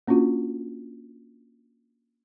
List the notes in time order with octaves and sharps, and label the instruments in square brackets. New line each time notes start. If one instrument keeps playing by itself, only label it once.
[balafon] A#3 C#4 D4 F4 F#4